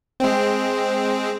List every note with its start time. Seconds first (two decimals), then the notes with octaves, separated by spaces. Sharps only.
0.20 G#3 C4